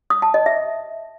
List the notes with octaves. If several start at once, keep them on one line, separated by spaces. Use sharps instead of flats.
D#6
A5
D#5
E5